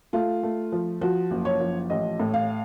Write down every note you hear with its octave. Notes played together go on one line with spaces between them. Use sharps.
A3 F4
A3
F3
F3 F#4
F#1
C#5
F3
A1 D#5
A2
F5